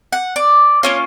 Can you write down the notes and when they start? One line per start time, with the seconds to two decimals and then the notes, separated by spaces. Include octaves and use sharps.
0.13 F#5
0.36 D5
0.83 A#3 C#4 F4 C#5